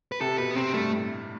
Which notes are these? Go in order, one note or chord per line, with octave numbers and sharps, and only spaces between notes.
B4
C3 A4
B2 B4
B3
C3 C4
G2 A3
A2